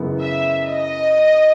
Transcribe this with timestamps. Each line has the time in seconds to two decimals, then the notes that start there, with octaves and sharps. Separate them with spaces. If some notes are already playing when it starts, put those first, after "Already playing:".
Already playing: F#2 C#3 E3 G#3 B3
0.20 E5
0.66 D#5